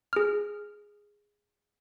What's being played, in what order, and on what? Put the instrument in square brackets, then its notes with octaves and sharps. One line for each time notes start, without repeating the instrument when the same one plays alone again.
[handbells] G#4 F6